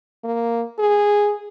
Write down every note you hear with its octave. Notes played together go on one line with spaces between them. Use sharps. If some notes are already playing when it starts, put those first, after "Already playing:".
A#3
G#4